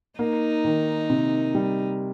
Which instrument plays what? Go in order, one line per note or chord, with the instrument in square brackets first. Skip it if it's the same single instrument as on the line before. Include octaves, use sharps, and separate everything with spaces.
[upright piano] A#3 [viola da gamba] D#4
[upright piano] D#3
C3
G3